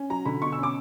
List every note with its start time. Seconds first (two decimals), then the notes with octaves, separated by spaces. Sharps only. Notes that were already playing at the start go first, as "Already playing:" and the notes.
Already playing: C#4
0.10 F#3 A#5
0.25 D3 B5
0.42 B2 C#6
0.52 E6
0.58 C#4 D6